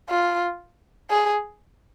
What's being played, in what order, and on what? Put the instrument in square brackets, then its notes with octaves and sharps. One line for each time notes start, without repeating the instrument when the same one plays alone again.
[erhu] F4
G#4